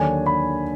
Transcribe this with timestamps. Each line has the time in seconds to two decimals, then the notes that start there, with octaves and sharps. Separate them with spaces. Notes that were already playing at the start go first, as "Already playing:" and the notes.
Already playing: D#2 D3 F#3 D4 G#5
0.26 B5